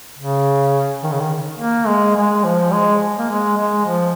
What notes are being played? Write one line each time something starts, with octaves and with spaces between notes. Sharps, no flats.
C#3
D#3
C#3
D#3
A#3
G#3
G#3
F3
G#3
A#3
G#3
G#3
F3